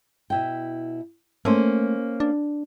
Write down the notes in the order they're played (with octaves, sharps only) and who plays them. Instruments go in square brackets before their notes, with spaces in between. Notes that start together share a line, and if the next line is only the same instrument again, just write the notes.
[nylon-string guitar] B2 E4 G5
[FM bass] A3 [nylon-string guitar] A#3 C#4 C5
[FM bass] D4